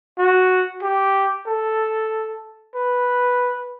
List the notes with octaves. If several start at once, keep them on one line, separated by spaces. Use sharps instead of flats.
F#4
G4
A4
B4